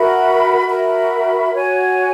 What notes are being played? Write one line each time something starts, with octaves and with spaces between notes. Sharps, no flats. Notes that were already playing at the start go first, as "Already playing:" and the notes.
Already playing: F#4 A#4 E5 B5
F#4 A#4 E5 B5
F#4 C#5 G#5